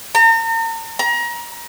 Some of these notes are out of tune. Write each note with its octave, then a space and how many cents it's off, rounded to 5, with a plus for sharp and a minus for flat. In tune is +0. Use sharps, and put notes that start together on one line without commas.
A#5 -40
A#5 +30